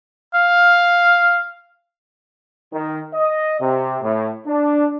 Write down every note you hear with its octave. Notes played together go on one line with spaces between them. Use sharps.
F5
D#3
D#5
C3
A2
D4